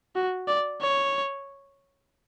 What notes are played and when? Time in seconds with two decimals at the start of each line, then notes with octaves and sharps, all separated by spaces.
0.15 F#4
0.48 D5
0.81 C#5